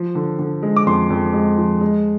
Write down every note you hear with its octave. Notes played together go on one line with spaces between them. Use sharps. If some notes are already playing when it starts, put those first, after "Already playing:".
Already playing: F3
D3
D3
G#3
D6
F2 C6
F2
G#3
F3
G#3